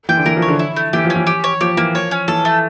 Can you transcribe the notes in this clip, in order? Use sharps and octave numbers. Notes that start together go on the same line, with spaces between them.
E3 G5
D3
E3 A#4
F3
C#5
D3
E4
A3
E3 G4
F3
C#4
E3
G4
C#5
F3 G4
E3 A#3
F3 C#5
C#4
E3 A4
A3